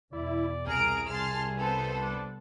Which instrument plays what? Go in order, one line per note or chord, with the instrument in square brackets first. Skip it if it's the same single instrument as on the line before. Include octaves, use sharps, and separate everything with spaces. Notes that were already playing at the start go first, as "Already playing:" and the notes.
[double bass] E2 B2 [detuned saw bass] E4 [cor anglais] D5
[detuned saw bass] C2 [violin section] G#4 A#5 D7 [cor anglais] A#4
[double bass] C3 G3 [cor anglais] G#4 [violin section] A5 C6 F6
[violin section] B3 A4 C5
[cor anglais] D4